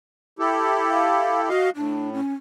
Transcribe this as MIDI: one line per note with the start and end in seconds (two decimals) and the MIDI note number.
0.39 1.49 64
0.39 1.49 67
0.39 1.49 69
0.89 1.40 77
1.49 1.70 66
1.49 1.70 75
1.49 1.70 77
1.76 2.20 45
1.76 2.10 62
2.13 2.33 61